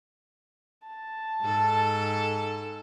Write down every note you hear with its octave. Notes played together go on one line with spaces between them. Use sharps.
A5
G#2 A4